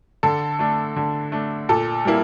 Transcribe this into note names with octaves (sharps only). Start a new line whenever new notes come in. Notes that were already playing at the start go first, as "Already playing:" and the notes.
D3 A4
A3 D4
D3
A3 D4
A#2 A4
G3 A#3 E4